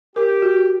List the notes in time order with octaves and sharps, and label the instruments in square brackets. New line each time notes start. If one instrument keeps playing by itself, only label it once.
[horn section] G4 [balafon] A#4
[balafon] F#4